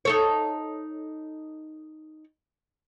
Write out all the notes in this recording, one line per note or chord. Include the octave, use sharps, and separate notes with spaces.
D#4 A4 C#5